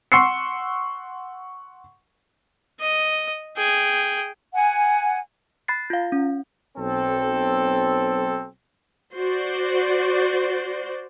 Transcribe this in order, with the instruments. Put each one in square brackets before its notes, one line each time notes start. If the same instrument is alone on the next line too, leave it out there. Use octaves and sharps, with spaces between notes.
[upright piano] F#5 C6 C#6 E6 C7 C#7
[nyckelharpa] D#5
G#4 G5
[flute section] F#5 G#5
[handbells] B5 F#6 A6 C7
F4 F5
C#4
[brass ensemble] B1 C4 A4
[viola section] F#4 C5 D5